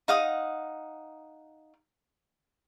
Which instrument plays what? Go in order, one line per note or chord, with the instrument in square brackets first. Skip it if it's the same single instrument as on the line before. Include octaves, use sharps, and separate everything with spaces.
[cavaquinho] D#4 F5 F#5 D#6